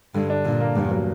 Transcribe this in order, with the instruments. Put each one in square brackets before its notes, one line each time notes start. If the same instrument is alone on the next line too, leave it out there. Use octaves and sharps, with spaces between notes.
[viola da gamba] G2 [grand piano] D3
[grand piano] D4
[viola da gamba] A#2 [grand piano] D3
[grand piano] A#3
[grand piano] E2 [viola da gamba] G2
[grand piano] F#3